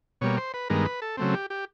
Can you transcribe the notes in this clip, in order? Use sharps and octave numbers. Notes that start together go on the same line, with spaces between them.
B2 G3 A#3 C#5
C5
B4
G2 D#3 G#3 B3 A#4
B4
A4
C#3 F#3 A3 C4
G4
G4